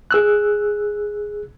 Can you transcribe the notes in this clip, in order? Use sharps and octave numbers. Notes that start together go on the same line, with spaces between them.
G#4 E6 F#6